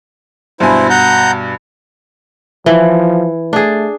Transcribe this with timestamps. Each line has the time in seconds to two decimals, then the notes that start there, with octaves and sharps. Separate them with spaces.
0.60 G2 B2 E4 C5 G#5
0.90 F#5 A#5 G6
2.66 E3 F3
3.53 A3 D4 G#4